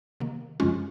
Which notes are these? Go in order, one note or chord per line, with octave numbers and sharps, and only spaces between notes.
C3 D#3 A#3
F#2 C#3 F3 G#3 C#4 F4